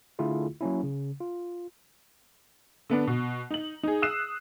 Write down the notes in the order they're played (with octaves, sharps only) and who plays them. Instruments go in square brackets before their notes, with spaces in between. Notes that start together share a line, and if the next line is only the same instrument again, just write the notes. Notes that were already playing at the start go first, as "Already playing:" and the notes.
[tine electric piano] D3 A3 E4 F4 G#4
F#3 A#3 C#4 E4
C#3
F4
[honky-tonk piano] D3 B3 D4
B2
D#4 F#7
D#4 G#4
D#6 E6 F#6 C7 E7